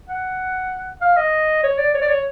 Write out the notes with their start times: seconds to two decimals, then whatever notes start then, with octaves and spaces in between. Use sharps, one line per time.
0.09 F#5
1.01 F5
1.17 D#5
1.63 C#5
1.78 D5
1.94 C#5
2.01 D5
2.09 C#5